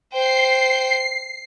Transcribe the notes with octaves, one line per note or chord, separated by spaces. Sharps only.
C5 G5 C7